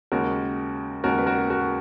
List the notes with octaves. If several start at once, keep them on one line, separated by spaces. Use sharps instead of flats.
D#2 C#3 G#3 F#4 A#4
D#2 C#3 G#3 F#4 A#4
B4
F#4 A#4
F#4 A#4